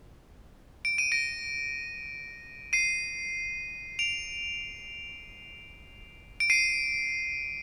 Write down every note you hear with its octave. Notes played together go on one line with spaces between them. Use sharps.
D7
D#7
A#6 D7
C7 D#7
D7 F7
D7
C7 D#7